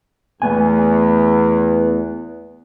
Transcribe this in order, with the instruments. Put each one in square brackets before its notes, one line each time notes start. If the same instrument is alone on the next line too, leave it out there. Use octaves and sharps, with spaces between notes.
[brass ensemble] E2 [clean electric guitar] A3 B3 G#5